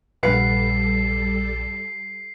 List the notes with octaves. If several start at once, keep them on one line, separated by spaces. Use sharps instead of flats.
A#1 G2 G3 A4 B4 F5 F#5 C7